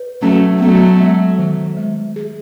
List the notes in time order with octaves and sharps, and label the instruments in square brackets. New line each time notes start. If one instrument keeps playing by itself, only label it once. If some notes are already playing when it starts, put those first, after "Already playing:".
Already playing: [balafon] B4
[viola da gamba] F#3 A3 [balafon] C#4
[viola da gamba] F#3 A3 [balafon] B3
[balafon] G#3
D#3
G#3
G#4